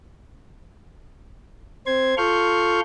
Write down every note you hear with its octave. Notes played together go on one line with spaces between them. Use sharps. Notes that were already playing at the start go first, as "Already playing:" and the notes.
C4 C5 C6 G#6
F4 A4 C6 C#6 F6 G6